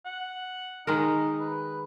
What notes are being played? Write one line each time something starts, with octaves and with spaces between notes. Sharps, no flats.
F#5
D#3 G#3 D#4 A#4
B4